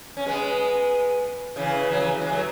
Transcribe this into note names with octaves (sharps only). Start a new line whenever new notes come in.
C#4
G#3 B3
C#3 E3
F#3
C#3 E3
E3 G#3
F#3 A3